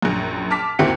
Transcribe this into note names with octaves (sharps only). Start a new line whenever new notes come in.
A#1 F#2
A5 D6 F6 B6
G#1 D#2 C4 E4 F#4 C#7